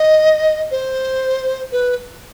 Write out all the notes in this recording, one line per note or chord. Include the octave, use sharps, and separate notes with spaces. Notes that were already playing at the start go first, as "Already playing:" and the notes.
Already playing: D#5
C5
B4